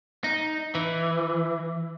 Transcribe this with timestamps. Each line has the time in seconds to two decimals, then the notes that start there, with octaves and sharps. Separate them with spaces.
0.24 D#4
0.75 E3